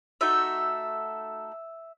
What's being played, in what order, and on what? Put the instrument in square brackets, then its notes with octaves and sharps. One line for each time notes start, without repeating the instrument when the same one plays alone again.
[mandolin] A3 D#4 F#4 A4 E5